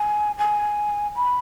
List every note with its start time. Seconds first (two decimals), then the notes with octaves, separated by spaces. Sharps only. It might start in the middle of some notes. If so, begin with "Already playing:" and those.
Already playing: G#5
0.38 G#5
1.16 B5